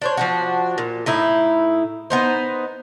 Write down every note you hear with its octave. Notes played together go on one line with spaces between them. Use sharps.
D4 C5 C#5
F3 D4 F#4
A#2
A2 D#4 E4
B3 D#4 C5